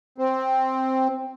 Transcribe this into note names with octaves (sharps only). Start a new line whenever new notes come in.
C4